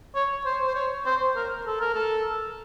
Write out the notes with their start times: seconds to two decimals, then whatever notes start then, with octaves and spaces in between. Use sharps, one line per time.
0.15 C#5
0.45 C5
0.67 C5
0.75 C#5
1.06 C5
1.36 A#4
1.66 A4
1.81 A#4
1.95 A4